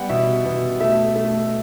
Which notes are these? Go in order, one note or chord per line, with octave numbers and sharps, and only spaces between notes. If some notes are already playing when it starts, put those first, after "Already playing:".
Already playing: G3 B3 F#5 G5 B5
B2 E5
B2
A3 E5
A3